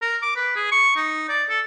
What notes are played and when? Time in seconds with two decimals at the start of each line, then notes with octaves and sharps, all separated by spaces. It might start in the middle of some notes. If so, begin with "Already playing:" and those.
0.02 A#4
0.23 D6
0.36 B4
0.56 G#4
0.72 C#6
0.97 D#4
1.29 D5
1.50 A4